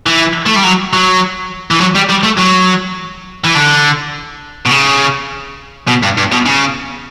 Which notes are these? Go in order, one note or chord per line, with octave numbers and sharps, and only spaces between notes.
E3
A3
G3
F#3
F#3
E3
F#3
G3
G3
A3
F#3
E3
D3
B2
C#3
B2
G2
G2
B2
C#3